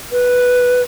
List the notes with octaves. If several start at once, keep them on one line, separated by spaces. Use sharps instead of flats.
B4